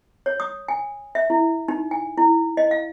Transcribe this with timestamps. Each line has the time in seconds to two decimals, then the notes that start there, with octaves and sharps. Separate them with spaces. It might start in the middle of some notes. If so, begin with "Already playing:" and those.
0.26 C#5
0.40 D#6
0.68 G#5
1.15 E5
1.30 E4
1.68 D#4
1.91 G#5
2.18 E4
2.57 D#5
2.71 F5